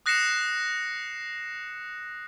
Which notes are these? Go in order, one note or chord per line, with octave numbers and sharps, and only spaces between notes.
D#6 F#6 A#6 C7 C#7 E7